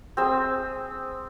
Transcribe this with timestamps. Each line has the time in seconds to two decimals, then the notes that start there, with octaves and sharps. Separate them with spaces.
0.17 C4 G#4 E6